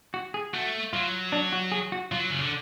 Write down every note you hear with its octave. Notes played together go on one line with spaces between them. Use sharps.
F#4
G#4
A3 F#4
F#3 F4
D4
F#4
G#4
F#4
F#3 F4
C#3
D3